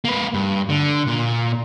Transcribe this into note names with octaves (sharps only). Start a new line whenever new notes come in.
A#3 B4
G2
D3
A#2